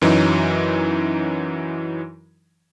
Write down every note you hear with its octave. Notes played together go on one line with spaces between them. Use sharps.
F#2 E3 F#3 D#4